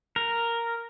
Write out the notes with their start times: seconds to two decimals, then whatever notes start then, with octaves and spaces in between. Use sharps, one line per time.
0.16 A#4